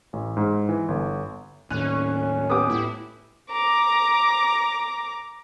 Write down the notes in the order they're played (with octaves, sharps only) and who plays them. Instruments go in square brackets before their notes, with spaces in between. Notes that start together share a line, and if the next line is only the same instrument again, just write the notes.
[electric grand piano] A1
G#2
E3
G1
[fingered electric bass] D#2 A2 [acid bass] C#4 [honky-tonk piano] F#6 D#7 F7
[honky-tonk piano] B3 G4 [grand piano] D6 D#6
[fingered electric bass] A2 [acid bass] E4
[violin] A#5 D6